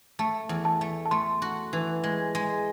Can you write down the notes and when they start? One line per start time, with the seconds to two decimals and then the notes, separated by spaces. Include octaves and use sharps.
0.19 A3 A5
0.49 E2
0.65 A5
0.81 A3
1.06 A5
1.11 A3 C6
1.42 F#4
1.73 E3
2.04 G#3
2.35 G#3